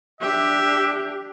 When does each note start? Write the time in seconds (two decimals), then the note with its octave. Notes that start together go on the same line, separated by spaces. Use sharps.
0.21 D4 G4 E5